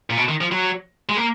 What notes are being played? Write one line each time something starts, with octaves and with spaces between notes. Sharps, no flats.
A#2
B2
D#3
F3
F#3
G#3
A#3